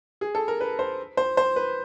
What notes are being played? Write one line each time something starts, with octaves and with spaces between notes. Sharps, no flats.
G#4
A4
A#4
B4
C5
C5
C5
B4